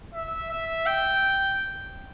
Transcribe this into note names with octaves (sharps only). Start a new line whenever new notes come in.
E5
E5
G5